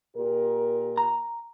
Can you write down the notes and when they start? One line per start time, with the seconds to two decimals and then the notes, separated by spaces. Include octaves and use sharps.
0.17 A#2 G4 A#4
0.97 A#5